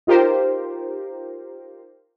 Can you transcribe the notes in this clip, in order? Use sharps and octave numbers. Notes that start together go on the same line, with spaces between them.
D#4 F4 G4 A#4 C5